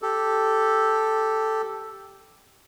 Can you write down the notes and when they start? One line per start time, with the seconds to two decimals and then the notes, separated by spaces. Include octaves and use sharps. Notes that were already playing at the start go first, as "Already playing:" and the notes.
0.02 G4 A4